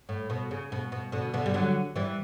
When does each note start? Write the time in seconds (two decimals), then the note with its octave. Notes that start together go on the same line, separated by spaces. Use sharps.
0.09 A2
0.30 B2
0.51 C#3
0.72 B2
0.92 B2
1.12 B2 D3
1.34 B2 D3
1.46 G3
1.54 D3 F#3
1.96 E3 G3